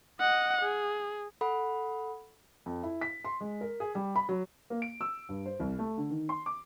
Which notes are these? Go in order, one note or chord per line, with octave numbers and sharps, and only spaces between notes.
D#5 F#5
G#4
A4 F#5 B5
F2
E4
B6
C6
G#3
A#4
G#4
G3
B5
F#3
A#3
D7
E6
G2
C5
C2
A3
D3
D#3
C6
D6